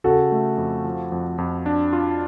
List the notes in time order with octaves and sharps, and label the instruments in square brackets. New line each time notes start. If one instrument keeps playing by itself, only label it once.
[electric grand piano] C#3 [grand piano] F#4 A4
[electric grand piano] A3
F2
F3
F2
F2
D4
F4